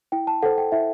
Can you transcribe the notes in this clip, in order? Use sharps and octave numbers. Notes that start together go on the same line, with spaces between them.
E4 G5
A5
A4 C5 F#5
G5
E4 E5